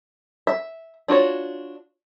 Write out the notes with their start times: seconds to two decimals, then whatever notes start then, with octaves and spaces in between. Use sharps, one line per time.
0.47 E5
1.08 D4 F4 F#4 C#5